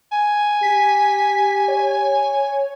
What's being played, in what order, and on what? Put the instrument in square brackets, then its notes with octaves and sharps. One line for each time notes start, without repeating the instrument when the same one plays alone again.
[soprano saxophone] G#5
[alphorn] G4 [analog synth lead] B6
[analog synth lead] C#5